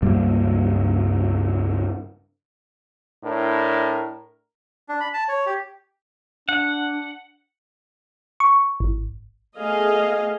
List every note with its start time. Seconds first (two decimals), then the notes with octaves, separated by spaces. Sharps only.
0.02 C#2 G2 G3 A#3
3.24 A2 D4 A#4
4.89 D4
5.00 B5
5.14 A5
5.29 C#5
5.46 G4
6.49 D4 F#5
8.40 C#6
8.80 G#1
9.58 A3 B3 G#4 D#5 F5 G#5